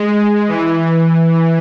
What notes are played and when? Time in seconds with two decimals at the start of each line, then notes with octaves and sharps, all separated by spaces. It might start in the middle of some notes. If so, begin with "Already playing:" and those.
Already playing: G#3
0.48 E3